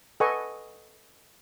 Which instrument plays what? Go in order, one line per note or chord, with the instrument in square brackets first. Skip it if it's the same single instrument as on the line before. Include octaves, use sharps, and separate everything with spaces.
[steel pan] A4 B4 D#5 F#5 G#5 C#6